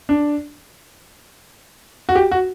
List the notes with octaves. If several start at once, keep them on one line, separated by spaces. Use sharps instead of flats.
D4
F#4
G4
F#4